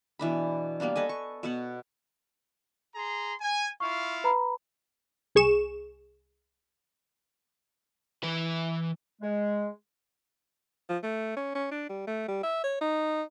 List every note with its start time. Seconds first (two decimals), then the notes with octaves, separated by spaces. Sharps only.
0.19 B2 E3 D4 B5
0.80 G3 A#3 B3 D4
0.96 A4 B4 D#5 G#5
1.09 C#6
1.43 B2 B3 F#5
2.95 G#4 A#5 C6
3.39 G#5
3.80 E4 F4 F5 C#6
4.24 B4 A#5 B5
5.35 C2 G#4 C#6 E7
8.23 E3 B4
9.21 G#3
10.89 F3
11.03 A3
11.36 C#4
11.55 C#4
11.71 D4
11.89 G3
12.07 A3
12.28 G3
12.43 E5
12.64 C#5
12.81 D#4